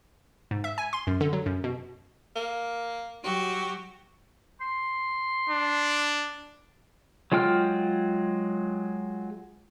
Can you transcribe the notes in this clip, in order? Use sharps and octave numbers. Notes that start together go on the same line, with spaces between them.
G#2
E5
G#5
C6
F#2
D3
F#3
F#2
B2
A#3
F#3 F#4 G4
C6
D4
F#3 G#3 F4 G5 F6